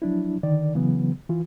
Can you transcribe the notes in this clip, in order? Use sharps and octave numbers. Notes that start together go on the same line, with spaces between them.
F3 F#3 D4 E4
D3 D#3 D5
C#3 E3 F#3 B3
E3 F4